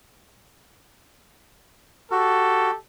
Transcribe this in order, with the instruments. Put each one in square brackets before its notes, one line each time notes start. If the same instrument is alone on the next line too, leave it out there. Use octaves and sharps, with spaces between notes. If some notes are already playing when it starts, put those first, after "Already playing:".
[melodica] F#4 [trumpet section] G4 A4